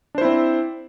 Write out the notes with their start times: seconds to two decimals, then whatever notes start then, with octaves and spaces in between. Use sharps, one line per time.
0.15 D4
0.18 C5
0.21 E4
0.25 C4